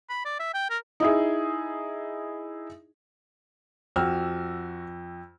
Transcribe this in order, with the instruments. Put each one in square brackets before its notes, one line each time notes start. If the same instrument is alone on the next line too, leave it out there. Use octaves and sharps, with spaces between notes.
[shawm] B5
D5
E5
G5
A#4
[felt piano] D#4 E4 G#4
[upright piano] F2 [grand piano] F#4 E6 F6